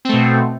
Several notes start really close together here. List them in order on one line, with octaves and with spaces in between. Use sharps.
C4 A3 B2